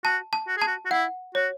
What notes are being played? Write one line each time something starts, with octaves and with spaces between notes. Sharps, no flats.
F#4 A5
A5
F#4
G#4 A5
F#4
F#4
E4 F#5
F#4 C#5